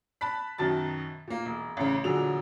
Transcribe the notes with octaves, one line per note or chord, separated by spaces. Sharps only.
A5 B5 F#6 B6
F#2 B2 D#3 A5 A6
A#2 A#3
E1
A1 C#3
E1 A#2 D3 F#3 G#4 F7